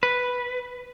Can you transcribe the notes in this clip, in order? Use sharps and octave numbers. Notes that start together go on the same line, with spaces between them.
B4